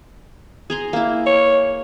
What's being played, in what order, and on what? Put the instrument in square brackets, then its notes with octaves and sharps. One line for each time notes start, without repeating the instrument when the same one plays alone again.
[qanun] G#4 A#5 C6
A#3 E4
[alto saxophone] C#5